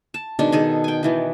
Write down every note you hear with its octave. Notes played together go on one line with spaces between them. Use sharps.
A5
B2 D#3 G#3 D4
D#3 G#4 A4
G5 G#5
D#3 E3 B3